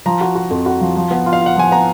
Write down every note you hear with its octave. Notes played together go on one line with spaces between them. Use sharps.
F3 A#5
F#4
F#4
F2
F#4
F3
F3
B3
F4
F5
F4
F#5
F3 G#5
B3 A#5